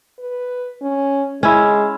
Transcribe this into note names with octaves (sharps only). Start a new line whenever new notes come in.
B4
C#4
G#3 C#4 E4